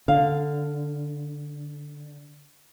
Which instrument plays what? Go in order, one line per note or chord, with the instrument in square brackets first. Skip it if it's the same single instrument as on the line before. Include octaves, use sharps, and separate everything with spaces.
[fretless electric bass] D3 [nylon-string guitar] F5